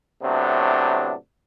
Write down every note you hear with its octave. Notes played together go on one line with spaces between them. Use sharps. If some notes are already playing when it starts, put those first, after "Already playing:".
A2 C3 F#3 B3 D4